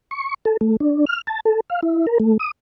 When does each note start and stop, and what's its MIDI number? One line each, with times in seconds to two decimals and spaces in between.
0.11 0.34 85
0.45 0.57 69
0.61 0.76 57
0.80 1.05 62
1.06 1.21 89
1.27 1.40 81
1.45 1.60 69
1.70 1.80 77
1.83 2.06 64
2.07 2.18 70
2.20 2.37 57
2.39 2.51 87